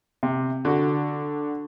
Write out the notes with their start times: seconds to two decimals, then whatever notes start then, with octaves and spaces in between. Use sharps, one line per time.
0.23 C3
0.65 D3 F#4